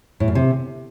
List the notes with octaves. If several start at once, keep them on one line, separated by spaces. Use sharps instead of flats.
A2
F#2
C3